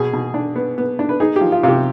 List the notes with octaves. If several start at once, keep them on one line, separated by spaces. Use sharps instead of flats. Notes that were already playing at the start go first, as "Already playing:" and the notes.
Already playing: B2 G#4
B2
D4
B3
B3
D4
B4
D#4 G#4
G4
F3
F4
C3 F4 G4